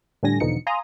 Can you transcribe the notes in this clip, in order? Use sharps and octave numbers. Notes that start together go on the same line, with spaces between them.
A2 D3 G3 D4 G#5 A#6
E2 B2 D3 F3 D#4 C#7
F5 G#5 A#5 C6 D#6